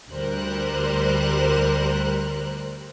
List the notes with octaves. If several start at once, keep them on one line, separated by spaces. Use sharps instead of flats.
D2 G3 A#4 C5 F#6